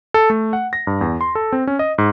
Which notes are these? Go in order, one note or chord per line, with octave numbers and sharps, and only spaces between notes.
A4
A3
F#5
A#6
G2
E2
C6
A4
C4
C#4
D#5
G#2